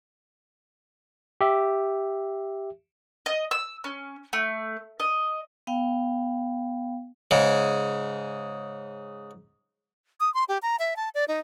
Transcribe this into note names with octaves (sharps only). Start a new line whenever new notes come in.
G4 E5
D#5
E6
C#4
A3
D#5
B3 F5 G5
G#2 C#3
D#6
C6
G4
A#5
E5
A5
D5
D#4